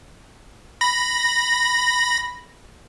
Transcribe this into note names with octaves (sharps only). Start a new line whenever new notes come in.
B5 A#6